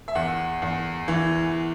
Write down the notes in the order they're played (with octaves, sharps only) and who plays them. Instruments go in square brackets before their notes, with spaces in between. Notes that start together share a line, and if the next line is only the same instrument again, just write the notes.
[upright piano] E5
E2 F#5
E2
E3